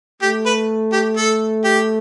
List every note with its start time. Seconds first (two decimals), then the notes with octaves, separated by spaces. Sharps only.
0.22 A3 G4
0.46 B4
0.92 G4
1.17 A4
1.64 G4